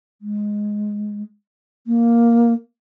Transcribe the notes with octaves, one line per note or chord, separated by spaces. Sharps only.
G#3
A#3